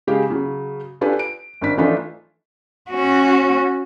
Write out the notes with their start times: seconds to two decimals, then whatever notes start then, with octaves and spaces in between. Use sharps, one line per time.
0.07 C#3 G#3 G4 G#4 F5
0.30 C#3 F#3
1.01 D4 F4 G4 A4 B4 G#5
1.19 D7
1.61 G#1 D4 B6
1.78 E3 F3 A3 D4 D#4 F4
2.90 C#4 F#4